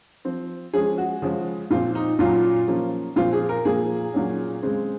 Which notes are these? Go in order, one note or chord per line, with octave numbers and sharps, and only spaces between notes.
F3 C4
F3 G#3 C#4 G#4
F#4
C#3 F3 G#3 C#4
A#2 F3 C4 F4
D#4
A#2 F#3 C#4 F4
F3 A#3 C#4
A#2 F3 C4 F4
G#4
A#4
A#2 F3 A#3 G#4
A#2 F#3 C#4
C#3 G#3 C4